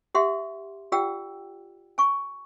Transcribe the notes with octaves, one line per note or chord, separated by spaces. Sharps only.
G4 E5 F#5 C6
F4 G4 D5 F#5 G5 E6
G#5 C#6